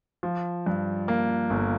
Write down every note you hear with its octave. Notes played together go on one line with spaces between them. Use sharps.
F3
G2
A#3
G1